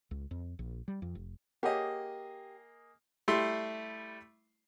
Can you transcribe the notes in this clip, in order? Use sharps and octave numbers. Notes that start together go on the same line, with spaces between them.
C#2
F2
A#1
G3
F2
F1
A#3 G4 G#4 C#5 D#5 F#5
G3 A3 E4 C6